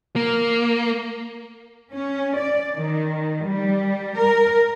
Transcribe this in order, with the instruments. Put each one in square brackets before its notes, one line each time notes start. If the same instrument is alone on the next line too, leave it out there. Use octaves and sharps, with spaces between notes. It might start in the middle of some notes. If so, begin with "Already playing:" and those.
[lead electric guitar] A#3
[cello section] C#4
D5
D#3
G3
A#4